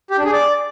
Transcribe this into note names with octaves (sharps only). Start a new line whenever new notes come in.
G4
D4
G#4
D5